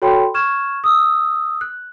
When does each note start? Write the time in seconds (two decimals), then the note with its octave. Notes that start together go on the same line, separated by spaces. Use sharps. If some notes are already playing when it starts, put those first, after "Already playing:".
0.02 F#4 A4 C#5 G5 B5 C6
0.34 C#6 F6 G#6 E7
0.84 D#6 E6
1.61 F#6